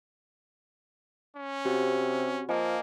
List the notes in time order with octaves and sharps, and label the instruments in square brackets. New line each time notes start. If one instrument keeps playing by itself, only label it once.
[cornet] C#4
[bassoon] C3 [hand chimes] C4 F#4 G4
[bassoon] F3 [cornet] A#3 [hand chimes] D#5 G#5 A5